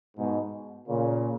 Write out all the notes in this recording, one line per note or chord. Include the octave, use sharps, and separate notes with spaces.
G#2 B2
A#2 C#3